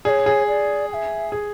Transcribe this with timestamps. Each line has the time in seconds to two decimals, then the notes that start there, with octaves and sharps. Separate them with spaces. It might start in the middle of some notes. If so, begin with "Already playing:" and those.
0.05 G#4 D5
0.09 C#5
0.26 G#4
0.48 D5
0.90 G#5
0.94 E5
1.32 G#4